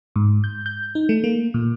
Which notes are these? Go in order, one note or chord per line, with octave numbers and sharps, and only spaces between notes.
G#2
G6
G6
D#4
A3
A#3
A#2